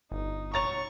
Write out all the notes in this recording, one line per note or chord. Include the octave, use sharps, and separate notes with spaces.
G1 D#4
B2 C#5 A#5 C#6 A6 F7